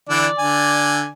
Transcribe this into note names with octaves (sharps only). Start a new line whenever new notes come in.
D3 E3 D4 D5
D3 G#5